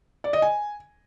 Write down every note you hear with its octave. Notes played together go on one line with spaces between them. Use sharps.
D5
D#5
G#5